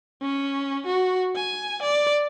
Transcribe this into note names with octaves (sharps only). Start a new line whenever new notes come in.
C#4
F#4
G#5
D5